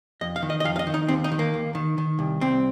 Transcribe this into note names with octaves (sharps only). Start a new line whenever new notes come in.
F2 D#5
F5
D#3
D#5
D#5
F2 F5
F5
D#5
D#3
D#4
D#2 C4
D#4
D#3
A#3
D#2
D#3
D#3
C2
C2 C4